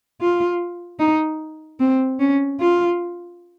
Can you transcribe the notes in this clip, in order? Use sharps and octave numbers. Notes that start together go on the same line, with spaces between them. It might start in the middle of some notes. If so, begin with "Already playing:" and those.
F4
D#4
C4
C#4
F4